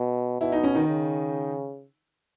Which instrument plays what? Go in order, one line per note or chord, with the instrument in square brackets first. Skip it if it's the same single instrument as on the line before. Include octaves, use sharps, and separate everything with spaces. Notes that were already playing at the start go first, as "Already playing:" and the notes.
Already playing: [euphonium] B2
[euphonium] B2 [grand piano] E4
[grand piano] D#4
C#4
D#3 D#4
[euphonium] C#3